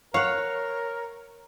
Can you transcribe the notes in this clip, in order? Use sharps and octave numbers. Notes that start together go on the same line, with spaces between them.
A#4 C#5 F5 F#5